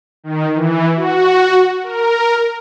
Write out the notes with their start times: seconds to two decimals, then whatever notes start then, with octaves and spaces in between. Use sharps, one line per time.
0.24 D#3
0.55 E3
0.96 F#4
1.83 A#4